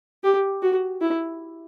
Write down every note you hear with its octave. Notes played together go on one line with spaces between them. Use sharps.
G4
F#4
E4